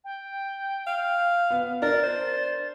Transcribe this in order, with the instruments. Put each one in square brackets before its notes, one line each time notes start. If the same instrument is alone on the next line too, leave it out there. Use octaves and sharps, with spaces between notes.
[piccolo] G5
[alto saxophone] F5
[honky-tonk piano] B3
[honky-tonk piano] D4 [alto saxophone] A#4 [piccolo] A6
[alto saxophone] C5